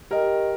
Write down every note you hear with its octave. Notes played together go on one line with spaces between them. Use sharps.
G4 A#4 D#5 G5